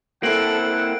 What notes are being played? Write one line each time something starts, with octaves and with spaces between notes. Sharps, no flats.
A#3 C4 E4 A4 F#5 D7 F#7